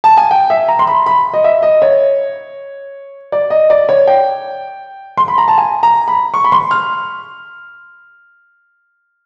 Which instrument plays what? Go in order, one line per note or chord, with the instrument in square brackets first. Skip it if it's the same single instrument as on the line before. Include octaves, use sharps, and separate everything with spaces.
[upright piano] A5
G#5
G5
E5
A#5
C6
B5
B5
D#5
E5
D#5
C#5
D5
D#5
D5
C#5
G5
C6
B5
A#5
A5
G#5
A#5
B5
C#6
B5
C6
F6